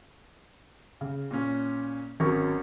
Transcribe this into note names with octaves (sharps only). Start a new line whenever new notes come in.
C#3
A#2 C#4
G#1 F#3 C#4 A#4 C#6